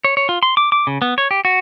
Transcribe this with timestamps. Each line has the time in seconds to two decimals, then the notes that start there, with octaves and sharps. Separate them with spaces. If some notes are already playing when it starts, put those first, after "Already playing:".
0.05 C#5
0.17 C#5
0.29 F4
0.43 C6
0.57 D6
0.72 D6
0.87 C#3
1.02 B3
1.18 C#5
1.31 G4
1.45 F#4